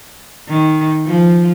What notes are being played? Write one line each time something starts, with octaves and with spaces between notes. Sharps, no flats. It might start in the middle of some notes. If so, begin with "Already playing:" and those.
D#3
F3